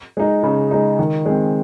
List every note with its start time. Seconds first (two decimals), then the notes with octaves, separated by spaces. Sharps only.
0.17 G#3 D#4
0.43 C#3
0.71 G#3 D#4
0.99 D#3
1.26 G#3 C4